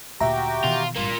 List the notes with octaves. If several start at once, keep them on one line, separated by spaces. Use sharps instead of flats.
D2 A#2 F#4 G4 E5 G5 A#5
B2 D#3 E3 F4
G#1 G2 A#3 F4